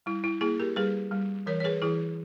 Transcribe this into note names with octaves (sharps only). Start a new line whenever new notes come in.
G3 E4
E4
A#3 E4 G#4
G4 A#4
G3 G#4 B4
G3
E3 A#4 C#5
C#5
G#4 B4
E3 E4 G#4